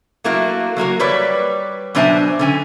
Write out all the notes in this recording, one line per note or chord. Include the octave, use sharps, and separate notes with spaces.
F#3 A3 A#3 E4 F#4
F#3 A#3 F#4 A#4
G3 B4 C#5 D5
B2 F#3 D4 C5 E5 G#5
D3 C#4 G#5